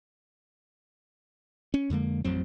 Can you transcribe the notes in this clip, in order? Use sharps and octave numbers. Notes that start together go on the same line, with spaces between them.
C#4
F2 D3 G#3 A#3
A1 F2 F#3 C4